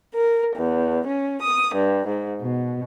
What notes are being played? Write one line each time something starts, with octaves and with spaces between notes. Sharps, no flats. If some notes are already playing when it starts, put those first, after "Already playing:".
A#4
E2
C#4
D#6
G2
G#2
B2